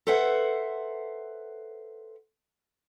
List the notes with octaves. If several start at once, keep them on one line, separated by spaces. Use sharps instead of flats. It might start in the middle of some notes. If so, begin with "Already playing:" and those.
A4 B4 C5 E5 F#5